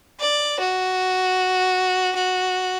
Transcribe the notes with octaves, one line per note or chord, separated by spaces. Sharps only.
D5
F#4
F#4